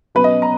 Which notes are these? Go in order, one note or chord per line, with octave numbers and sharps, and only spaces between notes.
B2 F#3 C#4 B4
D#5
A#5